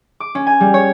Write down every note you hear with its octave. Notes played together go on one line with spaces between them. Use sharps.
D6
C#4
G#5
G3
C#5